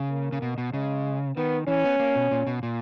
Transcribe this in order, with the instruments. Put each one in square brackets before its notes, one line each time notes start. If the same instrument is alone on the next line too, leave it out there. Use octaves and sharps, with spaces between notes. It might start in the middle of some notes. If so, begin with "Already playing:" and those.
Already playing: [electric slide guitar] C#3
[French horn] A#3
[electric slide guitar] C#3
B2
B2
[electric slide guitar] C#3 [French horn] G#3
[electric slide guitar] D#3 [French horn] B3
[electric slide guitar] E3 [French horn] C#4
[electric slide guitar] B3
A#3
B2
A#2
B2
A#2